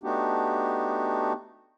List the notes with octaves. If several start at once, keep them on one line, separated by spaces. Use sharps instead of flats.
A3 B3 D4 D#4 F#4 G4